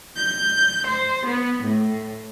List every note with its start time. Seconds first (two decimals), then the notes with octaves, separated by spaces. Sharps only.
0.16 G6
0.87 C5
1.26 B3
1.64 A2